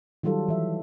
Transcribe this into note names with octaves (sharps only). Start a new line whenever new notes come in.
D#3 F#3 G3 F4 A4
E3 E5